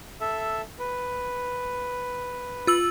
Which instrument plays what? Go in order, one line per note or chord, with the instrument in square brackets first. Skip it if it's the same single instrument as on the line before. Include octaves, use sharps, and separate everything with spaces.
[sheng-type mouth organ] A4 E5
B4
[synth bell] F4 E6 F#7